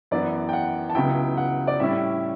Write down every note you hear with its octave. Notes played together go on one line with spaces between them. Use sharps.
F#2 E3 B3 D5
G5
F#5
A5
C#2 C#3 F#3 B3 E4 G5
F#5
D5
A2 G3 C#4 E4 E5